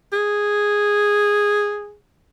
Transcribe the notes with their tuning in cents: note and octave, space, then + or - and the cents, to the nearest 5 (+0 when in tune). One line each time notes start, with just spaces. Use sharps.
G#4 -5